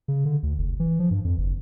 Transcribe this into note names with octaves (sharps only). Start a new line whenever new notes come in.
C#3
D3
D2
F1
E3
F3
G2
F2
F#1